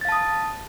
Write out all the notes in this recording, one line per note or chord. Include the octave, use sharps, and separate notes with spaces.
F5 A5 D#6 A6